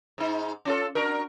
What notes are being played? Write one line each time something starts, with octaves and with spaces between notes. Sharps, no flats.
G#2 D#4
C#4 F4 A4
D4 F#4 A#4